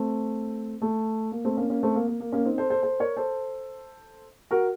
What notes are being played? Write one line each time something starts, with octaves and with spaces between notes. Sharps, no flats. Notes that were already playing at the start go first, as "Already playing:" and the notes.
Already playing: A3 C4
A3
A#3
A3 C4
A#3 C#4
A#3 C#4
A3 C4
A#3
A#3
A#3
A#3 C#4
C4 D#4
A4 C5
A4 C5
A4 C5
A#4 C#5
A4 C5
F#4 A#4